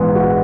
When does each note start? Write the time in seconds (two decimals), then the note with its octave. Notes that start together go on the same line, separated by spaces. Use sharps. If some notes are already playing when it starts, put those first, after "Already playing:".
Already playing: A#1 G#2 E3 B3
0.16 F#4